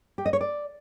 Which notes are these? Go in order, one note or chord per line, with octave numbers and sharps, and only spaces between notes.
G4
D#5
C#5
D5